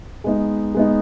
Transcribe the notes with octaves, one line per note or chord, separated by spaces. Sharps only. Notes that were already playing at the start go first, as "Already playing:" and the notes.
G#3 B3 D#4
G#3 B3 D#4